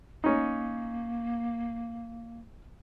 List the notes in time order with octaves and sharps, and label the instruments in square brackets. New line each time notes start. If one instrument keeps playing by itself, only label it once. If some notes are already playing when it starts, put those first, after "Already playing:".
[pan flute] A#3 [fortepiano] C#4 D#4